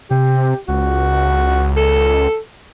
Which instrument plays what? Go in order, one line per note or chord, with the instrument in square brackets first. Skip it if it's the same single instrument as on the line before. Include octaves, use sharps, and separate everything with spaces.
[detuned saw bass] C3 [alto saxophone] G4
[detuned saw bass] C#2 [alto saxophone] F#4
[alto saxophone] A4